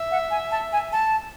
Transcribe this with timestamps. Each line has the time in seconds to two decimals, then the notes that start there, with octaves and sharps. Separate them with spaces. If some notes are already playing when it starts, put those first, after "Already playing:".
Already playing: E5
0.11 F#5
0.31 G#5
0.51 A5
0.72 G#5
0.92 A5